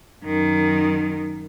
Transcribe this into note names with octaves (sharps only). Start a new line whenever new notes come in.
F#2 D#3